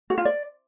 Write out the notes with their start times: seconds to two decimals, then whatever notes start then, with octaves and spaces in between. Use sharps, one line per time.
0.10 F#4
0.18 F4
0.25 D5